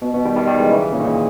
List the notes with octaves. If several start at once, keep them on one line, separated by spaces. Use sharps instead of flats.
B2
B2
D#3 G3
D#3 G3
D#3 G3
E3 G#3
C#3 E3
A#2 C#3
D#3
A#2 C#3